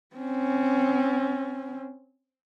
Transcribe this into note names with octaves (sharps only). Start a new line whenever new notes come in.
C4 C#4